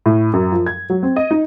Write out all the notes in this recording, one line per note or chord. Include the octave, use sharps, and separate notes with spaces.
A2
F#2
F3
G#6
F#3
C4
D#5
D#4